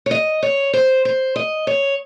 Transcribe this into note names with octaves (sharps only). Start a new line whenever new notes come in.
C#5
D#5
C#5
C5
C5
D#5
C#5